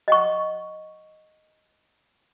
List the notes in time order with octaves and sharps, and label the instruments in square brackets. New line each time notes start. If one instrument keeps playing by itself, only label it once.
[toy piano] D#5 F#5 C#6